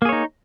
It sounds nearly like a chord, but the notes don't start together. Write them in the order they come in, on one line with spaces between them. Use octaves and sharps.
A#3 G#4 C#5 D#4